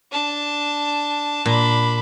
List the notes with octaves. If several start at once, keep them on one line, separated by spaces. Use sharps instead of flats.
D4 A5
A#2 D4 B5